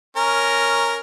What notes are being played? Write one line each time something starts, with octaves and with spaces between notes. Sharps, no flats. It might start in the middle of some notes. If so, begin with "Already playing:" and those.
C#4 A#4